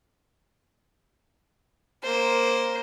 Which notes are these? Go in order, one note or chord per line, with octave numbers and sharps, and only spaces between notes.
A#3 C5